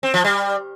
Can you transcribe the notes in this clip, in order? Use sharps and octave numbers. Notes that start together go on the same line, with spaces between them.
C4
F3
G3